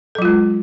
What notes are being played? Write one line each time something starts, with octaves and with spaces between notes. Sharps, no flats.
F#3 G#3 F4 A4